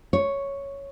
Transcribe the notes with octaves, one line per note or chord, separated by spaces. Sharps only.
C#5